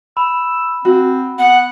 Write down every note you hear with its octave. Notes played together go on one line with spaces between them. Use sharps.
B5 E6
C4 F#4
B3 F#5